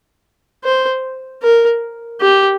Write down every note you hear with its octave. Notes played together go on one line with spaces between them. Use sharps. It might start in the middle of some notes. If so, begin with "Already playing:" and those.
C5
A#4
G4